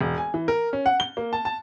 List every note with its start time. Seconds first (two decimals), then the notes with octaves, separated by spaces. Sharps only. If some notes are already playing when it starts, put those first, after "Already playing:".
0.01 E1
0.18 G#5
0.34 E3
0.48 A#4
0.73 C#4
0.86 F#5
1.00 G7
1.17 A#3
1.33 A5
1.45 A5